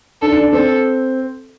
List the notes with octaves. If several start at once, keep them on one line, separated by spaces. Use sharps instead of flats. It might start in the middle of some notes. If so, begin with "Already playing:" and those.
D4 A4
D4
D4
C4 A4